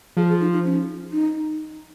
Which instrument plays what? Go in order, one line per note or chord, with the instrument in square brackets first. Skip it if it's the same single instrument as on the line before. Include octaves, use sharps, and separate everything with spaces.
[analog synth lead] F3 [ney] G#4
[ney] G#4
D#4
D#4
C#4
D#4